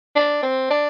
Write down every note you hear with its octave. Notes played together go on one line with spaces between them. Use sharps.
D4
C4
D4